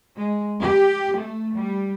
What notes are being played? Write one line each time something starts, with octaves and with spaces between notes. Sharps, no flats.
G#3
G4
A3
G3